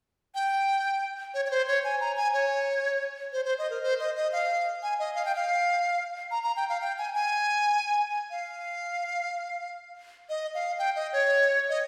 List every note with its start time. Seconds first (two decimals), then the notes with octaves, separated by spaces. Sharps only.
0.35 G5
1.34 C#5
1.45 C#5
1.51 C5
1.68 C#5
1.84 G#5
2.00 A#5
2.17 G#5
2.34 C#5
3.33 C5
3.45 C5
3.59 D#5
3.70 A#4
3.83 C5
3.99 D#5
4.16 D#5
4.32 F5
4.83 G#5
4.99 D#5
5.15 F5
5.25 G5
5.36 F5
6.31 A#5
6.44 A#5
6.57 G5
6.69 F5
6.81 G5
6.98 G#5
7.14 G#5
8.31 F5
10.29 D#5
10.55 F5
10.79 G5
10.96 D#5
11.13 C#5
11.69 D#5